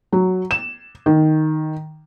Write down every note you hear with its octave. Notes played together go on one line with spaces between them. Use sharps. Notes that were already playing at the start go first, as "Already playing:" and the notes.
F#3
E7
D#3